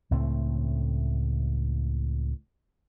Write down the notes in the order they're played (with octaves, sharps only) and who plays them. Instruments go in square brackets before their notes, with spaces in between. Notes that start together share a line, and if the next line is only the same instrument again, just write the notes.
[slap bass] C#2 A2 A3 C4